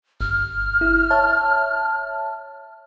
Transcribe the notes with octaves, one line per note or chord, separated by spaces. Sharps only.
G1 F6
E4
C#5 E5 A5